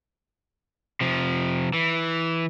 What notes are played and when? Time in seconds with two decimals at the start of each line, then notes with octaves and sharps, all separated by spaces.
1.01 C3 F3
1.74 E3